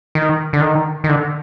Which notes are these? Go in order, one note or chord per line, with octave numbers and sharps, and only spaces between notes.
D#3
D3
D#3
D#3
D3